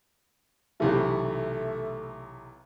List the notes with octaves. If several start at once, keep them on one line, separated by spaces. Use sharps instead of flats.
B1 C3 E3 A3